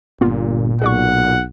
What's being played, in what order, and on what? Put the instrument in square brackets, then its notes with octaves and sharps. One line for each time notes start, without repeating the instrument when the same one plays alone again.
[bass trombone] G1 [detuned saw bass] A#2 [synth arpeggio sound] A#3 B3 F4
[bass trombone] B1 [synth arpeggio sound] G#4 D5 C#6 [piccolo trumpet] F#5